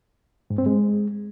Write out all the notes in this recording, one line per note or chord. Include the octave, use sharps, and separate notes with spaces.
G#2
C4
G#3